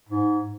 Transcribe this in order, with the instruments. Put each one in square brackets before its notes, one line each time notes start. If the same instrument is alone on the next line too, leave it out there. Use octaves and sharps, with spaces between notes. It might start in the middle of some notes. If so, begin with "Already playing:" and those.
[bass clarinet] G#2